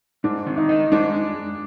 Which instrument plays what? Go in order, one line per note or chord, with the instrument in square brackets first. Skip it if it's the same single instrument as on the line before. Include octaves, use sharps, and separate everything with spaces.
[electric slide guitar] G#2 [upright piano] D4
[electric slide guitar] D#3
[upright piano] D#4
[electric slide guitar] D#4
[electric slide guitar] G#3 [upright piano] D4